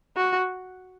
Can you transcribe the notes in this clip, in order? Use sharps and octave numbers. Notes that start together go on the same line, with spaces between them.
F#4